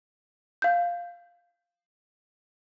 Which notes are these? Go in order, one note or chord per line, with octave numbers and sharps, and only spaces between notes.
F5 G6